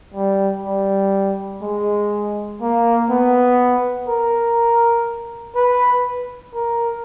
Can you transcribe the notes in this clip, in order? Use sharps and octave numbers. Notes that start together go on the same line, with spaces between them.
G3
G3
G#3
A#3
B3
A#4
B4
A#4